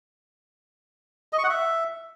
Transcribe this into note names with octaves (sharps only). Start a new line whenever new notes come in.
D#5
C#6
F#5
E5